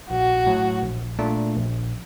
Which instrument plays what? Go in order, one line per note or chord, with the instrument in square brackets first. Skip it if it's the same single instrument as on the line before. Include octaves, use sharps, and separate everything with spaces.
[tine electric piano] A#1 [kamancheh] F#4
[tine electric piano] A2 F#3
A#1
A#2 A3 D4
A#1